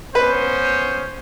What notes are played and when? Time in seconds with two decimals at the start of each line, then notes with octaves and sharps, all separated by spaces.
0.15 B3 C#4 B4 C5